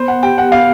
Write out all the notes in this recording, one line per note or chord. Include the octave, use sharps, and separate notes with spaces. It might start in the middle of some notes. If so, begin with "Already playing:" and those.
Already playing: B3 C5
F#5
G4 G5
F#5
B3 F5